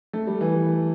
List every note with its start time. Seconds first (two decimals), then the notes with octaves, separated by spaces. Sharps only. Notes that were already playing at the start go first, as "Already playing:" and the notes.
0.13 A3
0.27 G3
0.41 E3